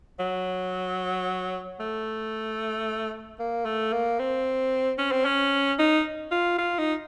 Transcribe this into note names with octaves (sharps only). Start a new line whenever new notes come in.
F#3
A3
A#3
A3
A#3
C4
C#4
C4
C#4
D#4
F4
F4
D#4